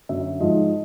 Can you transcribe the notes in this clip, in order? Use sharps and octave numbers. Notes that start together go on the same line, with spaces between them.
F#2 D3 F#3 E5
G#2 F3 D#5